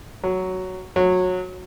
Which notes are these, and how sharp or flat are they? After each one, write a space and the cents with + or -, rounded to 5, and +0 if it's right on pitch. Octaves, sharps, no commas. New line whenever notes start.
F#3 +5
F#3 -20